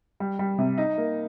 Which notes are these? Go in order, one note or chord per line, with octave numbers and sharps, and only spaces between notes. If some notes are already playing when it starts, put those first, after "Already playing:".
G3
G3
C3
D#4
A#3